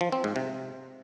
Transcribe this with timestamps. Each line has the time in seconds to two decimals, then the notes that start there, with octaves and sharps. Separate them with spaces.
0.01 F3
0.12 C4
0.24 G#2
0.36 C3